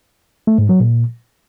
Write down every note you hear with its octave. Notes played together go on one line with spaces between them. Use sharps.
A3
G#2
F#3
A#2